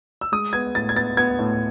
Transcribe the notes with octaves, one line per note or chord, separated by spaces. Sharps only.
E6
G#3 D#6
B3 G#6
A2 A6
G#6
B3 A6
B3 G#6
A2